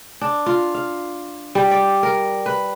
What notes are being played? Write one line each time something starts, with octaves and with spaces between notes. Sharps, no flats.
D4
F4
F5
G3
D5
A#4
B4